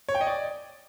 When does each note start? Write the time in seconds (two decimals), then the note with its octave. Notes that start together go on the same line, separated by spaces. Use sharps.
0.09 C#5
0.15 G5
0.21 D#5
0.27 D5